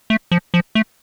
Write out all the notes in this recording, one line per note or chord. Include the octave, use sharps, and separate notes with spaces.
A3
F3
F3
A3